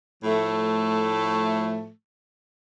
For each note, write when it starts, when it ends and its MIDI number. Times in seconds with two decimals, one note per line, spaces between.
0.23 1.89 45
0.23 1.89 53
0.23 1.89 57